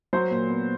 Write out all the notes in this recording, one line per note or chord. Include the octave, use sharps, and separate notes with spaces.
F#3 C5
A#2
B3